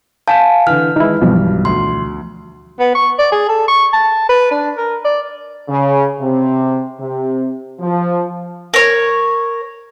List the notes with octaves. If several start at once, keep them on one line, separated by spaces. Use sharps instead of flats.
F5 G#5 A5 G6 B6 E7
D3 E3 F6
D#3 E3 G#3 D#4 E4
B1 G2 B2 E3 F3 G3
D2 C6
B3
C#6
D5
G#4
A4
C#6
A5
B4
D4
A#4
D5
C#3
C3
C3
F3
A#4 C#5